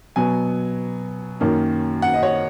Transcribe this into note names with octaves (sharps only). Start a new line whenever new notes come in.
B2 F#3 B3 G#5
F#2 D#3 A#3 C#4
F#5
D#5
C#5